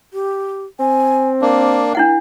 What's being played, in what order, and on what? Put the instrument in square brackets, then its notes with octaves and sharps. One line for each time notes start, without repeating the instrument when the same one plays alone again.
[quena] G4
[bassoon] C4 [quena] G#5
[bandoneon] A#3 D4 [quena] A#4
[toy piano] D4 E4 F#5